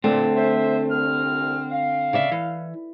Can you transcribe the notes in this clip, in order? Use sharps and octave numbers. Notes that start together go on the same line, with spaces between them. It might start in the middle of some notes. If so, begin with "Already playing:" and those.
A#2 D3 A3 C4
C5 E5
C2 F6
F5
C#3 D5 E5
E3